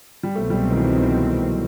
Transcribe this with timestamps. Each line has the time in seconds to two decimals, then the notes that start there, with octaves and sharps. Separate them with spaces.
0.23 G3
0.35 C2 B2 F#3 A3 C4
0.50 G3
0.56 A3
0.71 D#3
0.77 E3
0.96 D#3